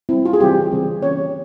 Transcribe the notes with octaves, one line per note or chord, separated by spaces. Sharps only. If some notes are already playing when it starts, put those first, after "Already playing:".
G3 C4 E4
F4
G#4
C#3 E3 G3 C4 G4
C#3 E3 G3 C4
E3 A#3 C#4 C#5